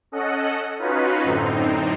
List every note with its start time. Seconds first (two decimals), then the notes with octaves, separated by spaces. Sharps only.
0.12 C#4 A4 D#5 F#5
0.79 C#4 D#4 F4 F#4 B4
1.23 F#2 A2 D3 C4 D#4